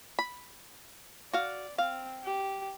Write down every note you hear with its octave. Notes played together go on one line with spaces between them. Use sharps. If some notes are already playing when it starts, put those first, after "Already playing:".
B5
F#4 D5 F5
C4 F5
G4